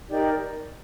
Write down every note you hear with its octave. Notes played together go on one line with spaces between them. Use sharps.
D#4 G4 A#4 D5